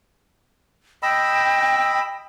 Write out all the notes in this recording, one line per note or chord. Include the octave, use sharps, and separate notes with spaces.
D#5 G5 B5 E6